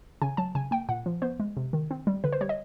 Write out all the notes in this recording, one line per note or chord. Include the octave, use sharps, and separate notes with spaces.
C#3 G#5
F#3 A5
C#3 G#5
A#3 G5
A#2 F#5
F3
B3 C5
G#3
C3
D#3
C4
G3
D3 B4
C5
G3 C#5
D#5